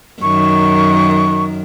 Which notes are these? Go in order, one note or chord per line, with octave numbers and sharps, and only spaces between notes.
F#2 D#3 C#6